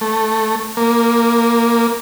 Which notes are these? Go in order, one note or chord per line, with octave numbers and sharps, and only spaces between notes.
A3
A#3